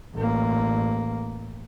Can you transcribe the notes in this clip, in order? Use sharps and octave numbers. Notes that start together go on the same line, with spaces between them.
A1 A#3